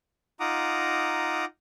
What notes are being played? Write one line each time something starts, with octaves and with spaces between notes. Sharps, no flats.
D#4 F4 F#5 A#5 D6 D#6